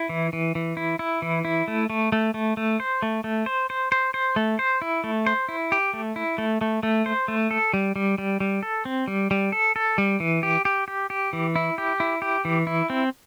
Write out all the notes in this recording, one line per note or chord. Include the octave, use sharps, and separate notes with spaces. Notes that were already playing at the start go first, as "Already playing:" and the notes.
Already playing: E4
E3
E3
E3
E4
E4
E3
E4
A3
A3
A3
A3
A3
C5
A3
A3
C5
C5
C5
C5
A3
C5
E4
A3
C5
E4
G4
A3
E4
A3
A3
A3
C5
A3
A4
G3
G3
G3
G3
A4
C4
G3
G3
A4
A4
G3
E3
G4
G4
G4
G4
E3
E4
G4
E4
G4
E3
E4
C4